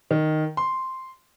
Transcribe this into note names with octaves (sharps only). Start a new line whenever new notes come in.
D#3
C6